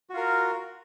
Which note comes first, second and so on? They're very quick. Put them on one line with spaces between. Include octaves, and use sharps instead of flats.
F#4 F4 A#4